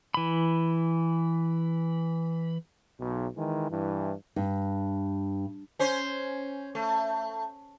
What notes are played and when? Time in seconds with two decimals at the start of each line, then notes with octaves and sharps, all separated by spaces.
0.14 E3 B5
3.00 B1
3.36 D#3 E3 G#3
3.71 G2 E3
4.36 G2
5.79 C#4 C5
6.75 A3